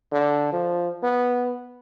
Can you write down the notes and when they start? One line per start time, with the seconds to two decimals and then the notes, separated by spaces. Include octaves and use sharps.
0.12 D3
0.53 F3
1.03 B3